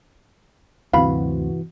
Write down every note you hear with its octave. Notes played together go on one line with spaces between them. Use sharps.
D2 G2 C3 E3 C4 F#4 F5 B5